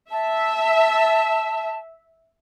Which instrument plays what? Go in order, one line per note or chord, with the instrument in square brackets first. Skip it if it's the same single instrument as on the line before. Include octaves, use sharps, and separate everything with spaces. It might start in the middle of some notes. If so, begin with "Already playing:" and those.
[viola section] E5 [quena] A5